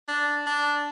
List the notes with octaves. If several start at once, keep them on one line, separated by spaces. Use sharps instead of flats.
D4
D4